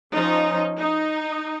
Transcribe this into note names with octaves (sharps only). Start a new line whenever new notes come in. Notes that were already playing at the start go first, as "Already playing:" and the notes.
F3 C#4 D#4
D#4